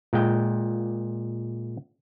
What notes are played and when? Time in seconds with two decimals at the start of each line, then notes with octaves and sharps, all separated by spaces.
0.13 A#2 G#3 G5